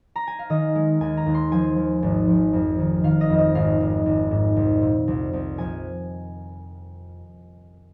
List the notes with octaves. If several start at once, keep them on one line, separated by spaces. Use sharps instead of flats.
A#5
G#5
F5
D#3 D#5
G#3
D#2 G#5
A#5
D#2
C6
F3 G#5
F3
G#1
F3
F2
D#3
D#3 F5
D#5
F2
D#5
G#1 F5
G#1
G#1
G#2
C2
A#2
C2
C2
A#1 G#5